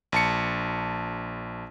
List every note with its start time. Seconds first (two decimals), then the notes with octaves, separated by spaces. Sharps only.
0.12 A#1 A5 C#7